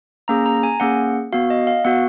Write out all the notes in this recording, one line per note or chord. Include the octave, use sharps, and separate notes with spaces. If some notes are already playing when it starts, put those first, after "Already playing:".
A#3 C#4 G#4 A#5
A#5
G#5
A#3 C#4 G#4 F#5
B3 F#4 F5
D#5
F5
B3 F#4 F#5